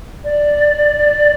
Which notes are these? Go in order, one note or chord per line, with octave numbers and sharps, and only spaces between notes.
D5